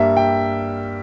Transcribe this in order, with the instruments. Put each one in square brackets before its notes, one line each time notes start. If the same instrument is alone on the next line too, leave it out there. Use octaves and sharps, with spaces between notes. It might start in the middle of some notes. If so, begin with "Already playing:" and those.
Already playing: [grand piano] G2 G3 A#3 E5
G5